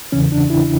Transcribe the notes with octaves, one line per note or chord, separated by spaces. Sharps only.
E2 C#3 E3 C#4
D4
E4